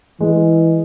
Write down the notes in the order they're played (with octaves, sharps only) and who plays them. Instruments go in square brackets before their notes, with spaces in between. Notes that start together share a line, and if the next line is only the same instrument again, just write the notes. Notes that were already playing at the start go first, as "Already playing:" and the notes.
[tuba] E3 [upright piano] G#3